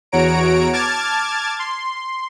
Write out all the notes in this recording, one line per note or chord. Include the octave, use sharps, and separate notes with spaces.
E2 F#4 C#5 A#5 D7
A5 D6 F6 G#6 A6
C6